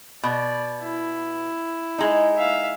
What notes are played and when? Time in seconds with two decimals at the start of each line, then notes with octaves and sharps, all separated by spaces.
0.23 B2 D5
0.82 E4
1.98 G#3 D#4
2.36 E5 F5